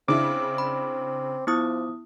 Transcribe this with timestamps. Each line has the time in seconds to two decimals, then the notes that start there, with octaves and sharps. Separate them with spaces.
0.08 C#3 C4 D4 E4 D6
0.58 B5
1.47 F3 B3 E4 D#6